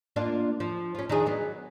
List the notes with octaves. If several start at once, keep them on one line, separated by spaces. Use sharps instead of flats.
A#3 D4 F4
F3
C#4 F4
D#3 D4 G#4
F#3 B3